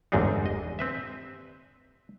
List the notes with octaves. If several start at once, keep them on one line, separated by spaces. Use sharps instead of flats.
G1 E2 G#2 C4 D4 D#4
D#5
C4 B4 E5